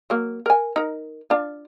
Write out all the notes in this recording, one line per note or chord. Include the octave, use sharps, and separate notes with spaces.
F#3 A#3
A#4 G#5
D#4 A#4
D4 F4